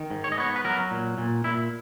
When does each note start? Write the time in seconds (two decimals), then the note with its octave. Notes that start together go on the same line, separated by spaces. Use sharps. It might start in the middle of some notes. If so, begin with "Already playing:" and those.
Already playing: D#3
0.11 G#2
0.24 C#5
0.32 D#5
0.38 B3 C#5
0.56 B4
0.65 F#3 A#4
0.91 A#2
1.18 A#2
1.44 A#2 E4